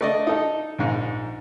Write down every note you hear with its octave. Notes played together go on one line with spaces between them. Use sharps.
A3 D5 D#5
D#4 A4
A#1 G#2